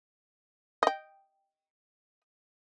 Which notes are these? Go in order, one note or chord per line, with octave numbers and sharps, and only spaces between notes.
D#5 G5